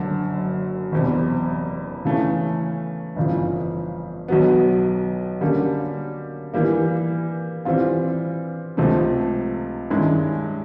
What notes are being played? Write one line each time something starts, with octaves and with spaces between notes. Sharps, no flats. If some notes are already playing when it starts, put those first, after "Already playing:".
Already playing: F#1 F#2 D3
F#1 E2 C3
C#3 E3 A3 C#4
G1 F2 C#3 E3
B1 B2 F#3 B3
D3 G3 A#3 C#4
E3 G3 A#3
E3 G3 C4 F4
C#2 C3 F3 A3 C4
G2 D#3 G#3 C#4 E4